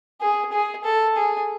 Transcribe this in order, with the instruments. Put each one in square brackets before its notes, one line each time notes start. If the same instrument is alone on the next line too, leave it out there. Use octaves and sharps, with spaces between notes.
[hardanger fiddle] G#4
G#4
A4
G#4